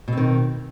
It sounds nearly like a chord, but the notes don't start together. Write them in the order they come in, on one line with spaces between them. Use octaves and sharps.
B2 C4 D#3